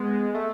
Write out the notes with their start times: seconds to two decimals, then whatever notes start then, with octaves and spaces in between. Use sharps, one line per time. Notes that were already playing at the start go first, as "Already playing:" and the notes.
Already playing: G#3 B3 B4
0.34 A3